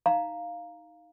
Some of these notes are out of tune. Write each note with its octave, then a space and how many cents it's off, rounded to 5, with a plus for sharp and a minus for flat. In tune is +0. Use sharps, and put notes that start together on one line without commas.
D#4 +10 F5 +0 A#5 +0